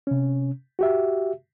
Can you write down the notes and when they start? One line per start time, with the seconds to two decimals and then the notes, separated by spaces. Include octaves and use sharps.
0.07 C3 C#4
0.79 F#4 G4 E5